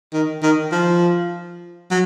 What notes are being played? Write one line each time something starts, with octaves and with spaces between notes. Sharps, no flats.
D#3
D#3
F3
F#3